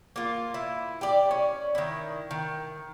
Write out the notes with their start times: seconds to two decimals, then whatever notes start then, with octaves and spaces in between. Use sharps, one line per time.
0.16 A#3 F4
0.54 E4
1.01 G4 D5
1.31 C#4
1.75 D#3 E4
2.31 D#3